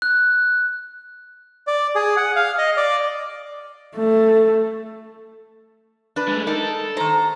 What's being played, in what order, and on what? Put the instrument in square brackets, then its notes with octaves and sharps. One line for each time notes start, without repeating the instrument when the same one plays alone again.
[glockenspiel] F#6
[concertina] D5
G#4
F#5
F5
D#5
D5
[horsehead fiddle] A3
[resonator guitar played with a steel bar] D4 B4
[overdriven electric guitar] G#3 A3
[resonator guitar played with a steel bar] D#4 A#4 [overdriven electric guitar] A4
[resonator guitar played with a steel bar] D#3 C5 [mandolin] A#5